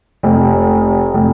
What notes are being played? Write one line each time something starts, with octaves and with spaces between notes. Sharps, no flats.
F1
F1